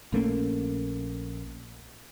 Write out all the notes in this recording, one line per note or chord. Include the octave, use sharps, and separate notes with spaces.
A#1 A3 A#3 C#4